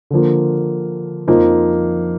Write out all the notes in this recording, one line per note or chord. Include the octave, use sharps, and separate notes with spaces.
D3 F3 A#3
F2 F3 A#3 D#4